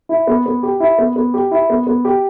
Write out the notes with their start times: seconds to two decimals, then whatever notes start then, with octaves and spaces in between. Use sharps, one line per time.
0.09 E4
0.27 B3
0.46 B3
0.63 G4
0.80 E4
0.98 B3
1.16 B3
1.34 G4
1.51 E4
1.70 B3
1.87 B3
2.05 G4